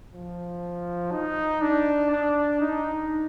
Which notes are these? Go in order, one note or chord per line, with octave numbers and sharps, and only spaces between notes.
F3
D#4
D4
D4
D#4